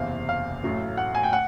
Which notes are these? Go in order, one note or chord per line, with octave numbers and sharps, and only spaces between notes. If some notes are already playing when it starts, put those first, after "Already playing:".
Already playing: F#1 E2 C3 F5
F5
A1 A2 F#3 A3
F#5
G#5
G5
F#5